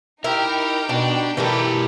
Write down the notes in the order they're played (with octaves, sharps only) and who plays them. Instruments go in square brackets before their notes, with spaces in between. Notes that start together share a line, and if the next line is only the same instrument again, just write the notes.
[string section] D#4 G5 [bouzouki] E4 [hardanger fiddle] G4 [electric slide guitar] A#4
[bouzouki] B2 [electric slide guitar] D4
[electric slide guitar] B2 A#4 [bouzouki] E3 G3 E4 [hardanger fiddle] A3 G4